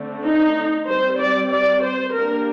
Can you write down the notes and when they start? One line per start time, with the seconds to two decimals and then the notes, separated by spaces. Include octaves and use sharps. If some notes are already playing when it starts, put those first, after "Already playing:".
Already playing: D3 A3 C4
0.24 D#4
0.88 G3 C4 C5
1.19 D5
1.51 D5
1.82 C5
2.14 G3 A#3 D4 A#4